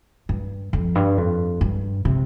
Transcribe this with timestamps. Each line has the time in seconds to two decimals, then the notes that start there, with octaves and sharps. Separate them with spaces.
0.29 G2
0.73 F2
0.95 G2
1.18 F2
1.61 G2
2.05 C3